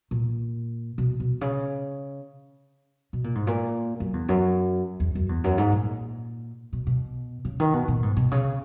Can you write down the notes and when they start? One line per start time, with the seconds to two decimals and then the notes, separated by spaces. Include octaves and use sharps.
0.11 A#2
0.98 B2
1.20 B2
1.41 C#3
3.13 B2
3.24 A#2
3.35 G#2
3.47 A#2
4.00 F#2
4.14 E2
4.29 F#2
5.00 E2
5.15 F#2
5.29 E2
5.44 F#2
5.58 G#2
5.72 A#2
6.73 B2
6.87 B2
7.45 C#3
7.60 D#3
7.73 B2
7.88 A#2
8.03 G#2
8.17 B2
8.31 C#3